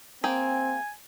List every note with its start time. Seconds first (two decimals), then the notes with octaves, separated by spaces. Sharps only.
0.24 A#3 C4 G#4 G5 G#5